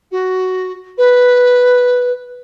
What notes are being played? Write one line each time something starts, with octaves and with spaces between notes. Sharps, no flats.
F#4
B4